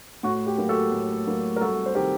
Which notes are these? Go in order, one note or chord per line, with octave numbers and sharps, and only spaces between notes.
A2 F#4
G4
F#3 A#3
F#4 A4
A2
F#3 A#3
A#4
C2 F#4 A4
C5
C3 D#3 G4 A#4